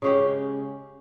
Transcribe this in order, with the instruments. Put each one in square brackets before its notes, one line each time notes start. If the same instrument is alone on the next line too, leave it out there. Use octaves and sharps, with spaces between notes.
[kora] C#3 G#3 C#4 G4